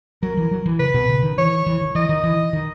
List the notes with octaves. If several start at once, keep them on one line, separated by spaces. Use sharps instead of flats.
F#3 A#4
E3
F#3
E3
C#3 B4
B2
C#3
D#3
E3 C#5
E3
D#3
E3 D#5
D#3
E3
D#3